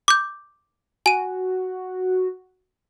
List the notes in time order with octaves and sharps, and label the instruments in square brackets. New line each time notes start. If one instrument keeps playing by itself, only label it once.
[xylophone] D6 G6
[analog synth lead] F#4 [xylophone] G#5 D#7